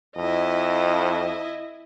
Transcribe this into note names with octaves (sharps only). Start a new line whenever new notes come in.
F2 E4 D#5